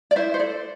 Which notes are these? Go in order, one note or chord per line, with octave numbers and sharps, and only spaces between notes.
D5
E4 C5 E5
C5
A4 D5